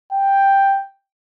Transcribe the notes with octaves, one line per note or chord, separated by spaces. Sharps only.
G5